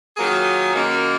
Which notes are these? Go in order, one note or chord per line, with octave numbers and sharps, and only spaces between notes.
D#3 F#3 A#3 F4 G#4
F#2 D#3 A#3